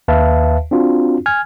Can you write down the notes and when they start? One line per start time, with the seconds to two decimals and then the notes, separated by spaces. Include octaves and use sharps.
0.08 D#2 B4 E5 F5 A5
0.71 C4 D4 F4 F#4
1.26 G#5 F6 G#6